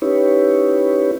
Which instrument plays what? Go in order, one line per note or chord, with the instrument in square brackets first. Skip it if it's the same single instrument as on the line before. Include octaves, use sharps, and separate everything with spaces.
[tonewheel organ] C#4 D#4 E4 G4 B4 C#5